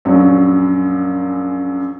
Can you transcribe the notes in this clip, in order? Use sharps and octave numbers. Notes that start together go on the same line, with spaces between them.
A#1 F#2 F#3